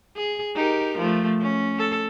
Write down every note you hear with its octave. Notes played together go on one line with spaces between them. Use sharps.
G#4
D#4 G4 A#4
F3 A3
C#4
A4